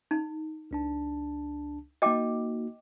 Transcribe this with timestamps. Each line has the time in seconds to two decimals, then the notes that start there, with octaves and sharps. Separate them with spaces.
0.11 D#4
0.71 C#2 D4 A5
2.02 A#3 D#4 F#4 D#5 G5 D6